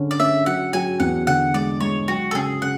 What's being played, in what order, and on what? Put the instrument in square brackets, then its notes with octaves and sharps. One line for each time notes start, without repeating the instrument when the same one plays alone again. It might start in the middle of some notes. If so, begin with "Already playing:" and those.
Already playing: [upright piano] D3 C#4
[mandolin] D5
[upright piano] C#4 [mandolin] E5
[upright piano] F#3 [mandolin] F#5
[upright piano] F#3 [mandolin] G#5
[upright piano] E2 [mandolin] F#5
[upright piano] D3 [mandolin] F#5
[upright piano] G#3 [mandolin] D5
[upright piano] G#3 [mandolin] C#5
[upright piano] F#3 [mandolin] F#4
[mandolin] A4
[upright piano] C#3 [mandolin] G#4
[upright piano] C#3 [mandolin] F#5